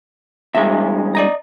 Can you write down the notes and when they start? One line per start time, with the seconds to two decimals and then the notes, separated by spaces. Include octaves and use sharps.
0.55 E2 G2 G#3 E5
1.15 D5 D#5 A#5